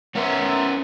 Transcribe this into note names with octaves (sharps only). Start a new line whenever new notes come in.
B3 C#4 A#4 C5 E5